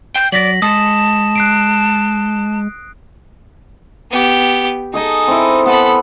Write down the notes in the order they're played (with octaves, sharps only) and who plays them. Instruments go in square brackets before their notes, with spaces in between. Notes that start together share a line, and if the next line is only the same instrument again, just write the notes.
[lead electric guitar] G5 [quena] G6
[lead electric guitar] F#3 [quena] D5 [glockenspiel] A#6 B6 F#7
[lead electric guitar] G#3 [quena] A5 [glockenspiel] D#6
[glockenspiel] F#6 C7 D7
[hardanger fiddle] B3 G4
[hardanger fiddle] D#4 A4 [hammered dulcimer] G#4 D#5 G#5
[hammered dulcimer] C4 E4
[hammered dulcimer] B3 [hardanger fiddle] A4 B5